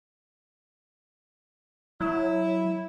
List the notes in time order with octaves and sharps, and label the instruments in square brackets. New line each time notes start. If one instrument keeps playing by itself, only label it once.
[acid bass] F#3 [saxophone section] E4